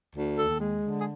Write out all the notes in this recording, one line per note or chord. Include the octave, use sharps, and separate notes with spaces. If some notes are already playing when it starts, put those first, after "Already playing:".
D2
D#2 A4
G#3
D3
G#4